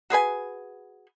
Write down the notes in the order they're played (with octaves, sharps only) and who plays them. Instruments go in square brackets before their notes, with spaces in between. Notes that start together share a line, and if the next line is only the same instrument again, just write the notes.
[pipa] F#4 G#4 B4 G#5